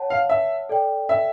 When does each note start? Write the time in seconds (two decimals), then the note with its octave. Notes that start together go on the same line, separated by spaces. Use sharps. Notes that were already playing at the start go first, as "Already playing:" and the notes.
Already playing: C#5 F#5 A5
0.10 F5
0.30 E5
0.69 A4 D5 G5
1.09 E5